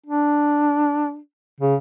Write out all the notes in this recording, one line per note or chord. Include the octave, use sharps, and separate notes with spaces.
D4
C#3